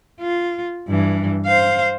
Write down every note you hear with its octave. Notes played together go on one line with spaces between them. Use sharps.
F4
G2 E3
C5 F5